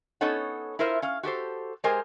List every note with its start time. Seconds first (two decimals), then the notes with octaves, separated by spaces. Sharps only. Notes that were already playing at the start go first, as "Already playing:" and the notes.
0.21 B3 C#4 D#4 A4 C#5 F#5
0.79 E4 F4 A#4 C5 E5
1.02 C#4 F5
1.23 F#4 G4 A4 C5
1.84 G#3 G4 G#4 A#4 C5 G#5